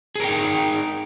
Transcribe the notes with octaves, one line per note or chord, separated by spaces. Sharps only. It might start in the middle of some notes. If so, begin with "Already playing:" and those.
D#4 G#4 A#4 G5